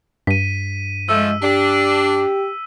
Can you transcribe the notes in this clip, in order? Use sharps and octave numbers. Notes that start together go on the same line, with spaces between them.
G2 B6 D#7
F3 G#3 A3 E6
D4 G4